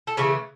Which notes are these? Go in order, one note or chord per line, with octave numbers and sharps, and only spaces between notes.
A4
C#3 E3 A3 G#4